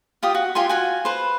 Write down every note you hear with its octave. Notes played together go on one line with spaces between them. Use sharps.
F4 G4 D#6
F#4
F4 G4 G#5 C6
F4 F#4 G#5
B4 C5